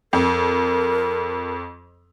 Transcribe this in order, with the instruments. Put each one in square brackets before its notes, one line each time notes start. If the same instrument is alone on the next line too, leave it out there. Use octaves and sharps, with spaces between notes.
[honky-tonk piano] F2 [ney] A#4